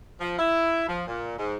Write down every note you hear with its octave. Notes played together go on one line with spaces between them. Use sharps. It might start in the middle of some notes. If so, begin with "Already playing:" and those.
F3
E4
F3
A#2
G#2